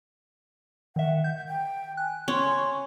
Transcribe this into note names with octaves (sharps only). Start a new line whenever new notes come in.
D#3 E5 F#5
G6
G5
G#5 F#6
C#4 C6 C#6